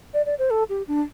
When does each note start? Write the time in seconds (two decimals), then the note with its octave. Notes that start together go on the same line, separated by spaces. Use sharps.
0.14 D5
0.26 D5
0.39 C5
0.50 A4
0.70 G4
0.88 D4